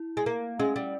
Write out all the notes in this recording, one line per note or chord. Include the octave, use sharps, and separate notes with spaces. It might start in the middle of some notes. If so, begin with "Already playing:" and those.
Already playing: E4
G#3
A#3
G#3 C#4
G3